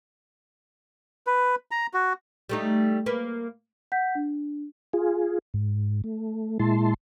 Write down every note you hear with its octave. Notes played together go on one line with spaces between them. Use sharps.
B4
A#5
F#4
G3 A3 D#4
A#3 B4
F#5 G6 B6
D4
F4 G#4
G#2
A3
A#2 G#3 E4 A5 C6